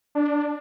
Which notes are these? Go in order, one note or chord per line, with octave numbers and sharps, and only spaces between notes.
D4